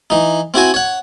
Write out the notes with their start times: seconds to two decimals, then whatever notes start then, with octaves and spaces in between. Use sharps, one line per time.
0.10 E3 D#4
0.54 C4 E4 F#4 G#5
0.74 C#5 F#5